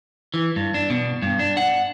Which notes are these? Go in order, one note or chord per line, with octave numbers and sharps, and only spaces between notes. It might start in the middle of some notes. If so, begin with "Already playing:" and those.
E3
G2
D4
B2
G2
D4
F#5